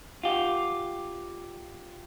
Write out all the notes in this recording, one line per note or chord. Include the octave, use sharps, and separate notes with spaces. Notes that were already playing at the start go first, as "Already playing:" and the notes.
F4 G4